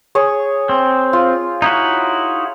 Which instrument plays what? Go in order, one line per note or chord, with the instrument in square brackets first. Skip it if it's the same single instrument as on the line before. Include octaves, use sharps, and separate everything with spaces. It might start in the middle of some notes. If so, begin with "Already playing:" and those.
[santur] G#4 C#5
[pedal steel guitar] C4
[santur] F4
[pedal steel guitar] D#4 E4 F#4